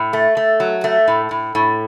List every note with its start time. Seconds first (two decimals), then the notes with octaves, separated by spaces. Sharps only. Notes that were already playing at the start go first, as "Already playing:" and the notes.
Already playing: A2
0.13 A3
0.37 A3
0.60 F#3
0.84 A3
1.08 A2
1.31 A2
1.55 A2